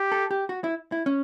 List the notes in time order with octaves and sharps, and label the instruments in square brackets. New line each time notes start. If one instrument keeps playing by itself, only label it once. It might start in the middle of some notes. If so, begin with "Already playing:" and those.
Already playing: [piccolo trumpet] G4
[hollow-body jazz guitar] A4
G4
F#4
E4
E4
C#4